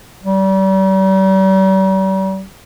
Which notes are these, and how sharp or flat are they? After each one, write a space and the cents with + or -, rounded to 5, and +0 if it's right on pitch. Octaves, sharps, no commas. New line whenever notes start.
G3 -40